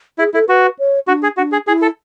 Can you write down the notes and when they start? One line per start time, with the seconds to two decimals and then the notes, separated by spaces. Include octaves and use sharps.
0.19 E4 G#4
0.34 E4 A4
0.49 F#4 B4
0.79 C#5
1.08 D4 F#4
1.23 G#4
1.37 D4 F#4
1.52 G#4
1.67 E4 G#4
1.82 A4